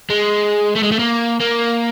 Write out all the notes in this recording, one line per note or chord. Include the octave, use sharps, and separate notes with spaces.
G#3
A3
G#3
A3
A#3
A#3